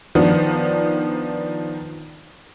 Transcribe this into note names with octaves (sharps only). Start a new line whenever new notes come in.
D#3 F3 B3 D4